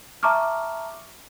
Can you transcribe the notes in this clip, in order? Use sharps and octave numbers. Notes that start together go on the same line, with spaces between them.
E5 A5 A#5 C#6 D6 F6